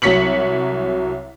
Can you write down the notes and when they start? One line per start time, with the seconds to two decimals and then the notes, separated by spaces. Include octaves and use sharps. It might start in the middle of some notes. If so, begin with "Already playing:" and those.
0.02 C2 F#3 C#5 B6 C#7 F#7